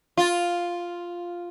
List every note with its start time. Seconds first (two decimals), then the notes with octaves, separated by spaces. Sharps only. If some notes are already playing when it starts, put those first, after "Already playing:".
0.17 F4